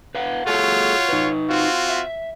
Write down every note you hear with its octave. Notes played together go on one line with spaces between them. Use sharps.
B4 F5 F#5
A3 F4 F#4 G#4 A4 C#5
D#4 B4
C4 F4 F#4
E5